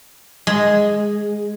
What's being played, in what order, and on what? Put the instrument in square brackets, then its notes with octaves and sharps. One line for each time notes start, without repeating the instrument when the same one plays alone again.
[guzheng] G#3